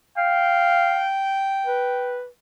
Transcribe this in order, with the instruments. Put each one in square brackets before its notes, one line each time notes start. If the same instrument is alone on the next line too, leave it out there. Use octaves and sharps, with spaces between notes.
[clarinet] F5 [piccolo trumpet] G5
[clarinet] B4